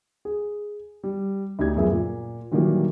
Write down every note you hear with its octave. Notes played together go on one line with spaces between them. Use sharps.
G#4
G3
D2 D#4 G4 G#6
F#2 F3 B3 G#4 E5
A#2
A#2 D#3 E3 F#3 G3 A#3